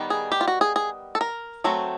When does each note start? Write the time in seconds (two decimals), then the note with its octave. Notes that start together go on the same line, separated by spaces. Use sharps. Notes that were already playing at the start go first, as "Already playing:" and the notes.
Already playing: D#3 G3 B3
0.10 G#4
0.32 G4
0.41 F4
0.47 F#4
0.61 G#4
0.76 G#4
1.15 A4
1.21 A#4
1.64 F#3 A3 C4